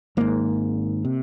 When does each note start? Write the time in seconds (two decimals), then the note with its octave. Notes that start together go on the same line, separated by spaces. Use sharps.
0.17 G#1 G#2 A#3
1.05 C3